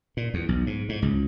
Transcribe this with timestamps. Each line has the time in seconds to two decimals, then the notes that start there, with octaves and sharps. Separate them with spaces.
0.17 A#2
0.34 E2
0.49 B1
0.67 G#2
0.89 G#2
1.02 C#2